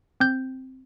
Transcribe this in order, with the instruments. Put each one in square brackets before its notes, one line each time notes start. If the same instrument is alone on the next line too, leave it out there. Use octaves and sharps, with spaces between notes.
[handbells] C4 G6